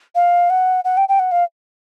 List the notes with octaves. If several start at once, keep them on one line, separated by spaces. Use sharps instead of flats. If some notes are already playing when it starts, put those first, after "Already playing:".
F5
F#5
F#5
G5
G5
F#5
F5